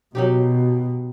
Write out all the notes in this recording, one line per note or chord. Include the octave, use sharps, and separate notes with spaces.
B2 F#3 D#4 G4